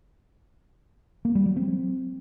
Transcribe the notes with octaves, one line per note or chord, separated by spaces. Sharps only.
A#3
G3
F#3
C4